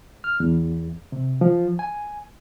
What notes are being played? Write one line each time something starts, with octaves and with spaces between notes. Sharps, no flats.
F6
E2
C3
F3
G#5